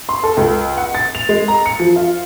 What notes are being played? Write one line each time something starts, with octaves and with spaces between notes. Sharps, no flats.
C6
A4
C#2
F#5
A6
F7
G#3
A#5
C#7
F3
F4